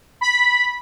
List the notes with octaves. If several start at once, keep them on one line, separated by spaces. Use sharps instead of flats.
B5